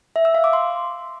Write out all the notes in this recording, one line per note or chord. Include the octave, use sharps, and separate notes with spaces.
E5
E6
F5
D6
C6